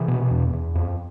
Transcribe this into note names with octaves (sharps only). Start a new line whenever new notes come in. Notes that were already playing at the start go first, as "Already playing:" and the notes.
Already playing: C3 E3
B2
E2
E2
F2